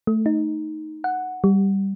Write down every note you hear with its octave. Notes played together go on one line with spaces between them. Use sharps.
A3
D#4
F#5
G3